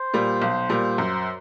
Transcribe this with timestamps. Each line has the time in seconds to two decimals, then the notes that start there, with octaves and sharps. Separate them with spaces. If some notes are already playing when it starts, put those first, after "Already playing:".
Already playing: C5
0.14 A#2 G3
0.42 B1
0.70 A#2 G3
0.98 F#2